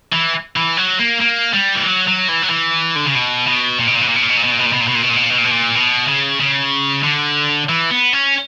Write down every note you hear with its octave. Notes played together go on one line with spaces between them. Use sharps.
E3
E3
F#3
A#3
A#3
G3
E3
F#3
F#3
E3
F#3
E3
D3
C#3
B2
B2
A#2
B2
A#2
B2
A#2
B2
A#2
B2
A#2
B2
A#2
B2
A#2
B2
A#2
B2
A#2
B2
A#2
B2
A#2
B2
A#2
B2
A#2
B2
C#3
C#3
D3
E3
B3
C#4